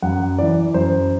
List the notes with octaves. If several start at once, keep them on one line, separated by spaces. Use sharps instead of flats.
F#2 F#5
E3 D5
F#2 C5